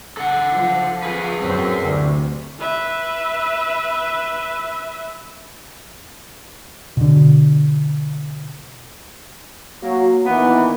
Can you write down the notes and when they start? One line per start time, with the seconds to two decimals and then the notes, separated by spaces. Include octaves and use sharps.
0.17 A4 F#5
0.52 F3
1.03 G#4 B4
1.41 F#2 C4
1.82 D2 C3
2.60 B4 E5
6.97 B2 D3
9.82 F#3 A#3
10.25 A#2 D#3 E3 B3